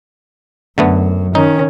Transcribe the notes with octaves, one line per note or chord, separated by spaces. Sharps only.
F#2 D3 A3 B3
D#3 C#4 D#4